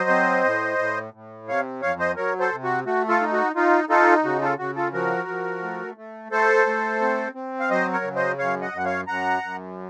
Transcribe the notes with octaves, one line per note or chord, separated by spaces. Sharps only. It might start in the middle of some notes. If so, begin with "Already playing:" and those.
Already playing: F#3 C5 D#5
C4
A2
A2
A2
C3 C#5 F5
F2 C#5 F5
C5 D#5
F#3 A#4 C#5
A4 C5
C3
F#4
A3 F#4
F4 A4
D#4
F#4
D#4 F4
D#4 F4 A4
C#3 F#4
F4 A4
C#3 F#4
F4 A4
F3 F#4 A#4
F3
A3
A3
A3 A4 C5
A3
C4
C4
F5
F#3 C5 D#5
A#4 C#5
C#3
C5 D#5
F#2 C#5 F5
D#5 F#5
F#2 F#5
C#5 F5
F#2 F#5 A#5
F#2